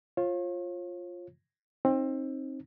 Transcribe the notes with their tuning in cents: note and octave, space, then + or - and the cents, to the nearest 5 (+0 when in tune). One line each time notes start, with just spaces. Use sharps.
F4 +0 C#5 -45
C4 +25 D#4 +0